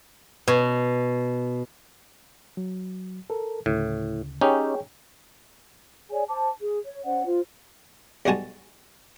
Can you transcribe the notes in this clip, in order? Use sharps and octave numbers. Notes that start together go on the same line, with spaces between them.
B2
F#3
A4 A#4
D2 A2 C#3
C#4 D#4 G4 G#4 C#5 G5
G#4 C#5 D5 G#5
C5 A5 D6
G#4
C#5
C#4 C5 D5 F#5
F4 C5
B1 G3 G#3 F#4 G#5 A5